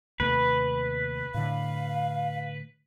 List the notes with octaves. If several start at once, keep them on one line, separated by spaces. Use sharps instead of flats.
D#2 C3 A3 B4
A2 D3 F5